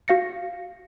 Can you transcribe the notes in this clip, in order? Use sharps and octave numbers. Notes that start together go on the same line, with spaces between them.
F#4 F5 A#6 C#7